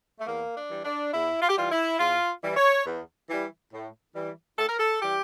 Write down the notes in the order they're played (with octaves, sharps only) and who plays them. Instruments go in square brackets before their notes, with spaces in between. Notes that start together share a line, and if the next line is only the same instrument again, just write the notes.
[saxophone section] A3
E2 A#3
D4
E3 G3
D4
E2 E4
F4
G4
E3 G3 F4
E4
E2 F4
E3 G3
C#5
E2
E3 G3
A2
E3 G3
A2 A4
A#4
A4
E3 G3 G4